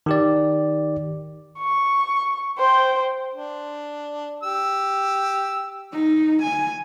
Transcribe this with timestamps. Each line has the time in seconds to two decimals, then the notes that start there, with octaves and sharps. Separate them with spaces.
0.06 D#3 G4 D5
1.59 C#6
2.59 C5 G5
3.34 D4
4.43 G4 E6
5.92 D#4
6.43 G#5